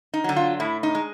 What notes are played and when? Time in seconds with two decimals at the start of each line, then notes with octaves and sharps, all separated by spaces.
0.14 D#4
0.24 D3 F#3
0.36 F4
0.60 A2 E4
0.83 D#4
0.95 G#3